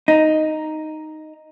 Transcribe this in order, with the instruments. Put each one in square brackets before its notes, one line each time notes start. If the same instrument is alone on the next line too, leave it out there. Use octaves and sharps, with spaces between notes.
[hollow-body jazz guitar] D#4